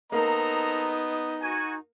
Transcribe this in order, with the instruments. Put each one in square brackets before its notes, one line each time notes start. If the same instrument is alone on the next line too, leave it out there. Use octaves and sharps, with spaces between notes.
[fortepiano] A#3 [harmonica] B3 D#5 [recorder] D#4 [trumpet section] A4 C5 A#5
[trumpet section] F#4 G#5